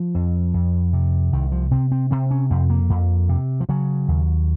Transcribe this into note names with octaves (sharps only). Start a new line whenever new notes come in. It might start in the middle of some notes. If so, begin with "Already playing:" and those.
Already playing: F3
F2
F2
C3
C2 D#3
F3
C3 C4
C4
C3 C4
C#4
F2 C4
A#3
F2
C3
F3
C#3 F#3
D#2